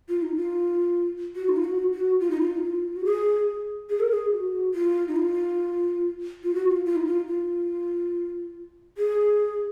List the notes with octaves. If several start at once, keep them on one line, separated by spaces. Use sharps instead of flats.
F4
D#4
F4
F#4
D#4
F4
F#4
F#4
F4
D#4
F4
D#4
F4
F#4
G#4
G#4
A#4
G#4
F#4
F4
D#4
F4
F4
F#4
F4
F4
D#4
F4
F4
G#4